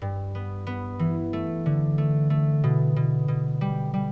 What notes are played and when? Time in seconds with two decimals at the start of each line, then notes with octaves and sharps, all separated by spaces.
0.02 G2
0.35 B3
0.67 B3
0.99 E3
1.33 A3
1.66 D3
1.98 A3
2.30 A3
2.64 B2
2.96 B2
3.28 B2
3.61 G3
3.94 G3